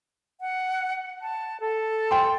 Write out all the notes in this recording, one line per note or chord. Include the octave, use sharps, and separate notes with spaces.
F#5
A5
A4
G5 C6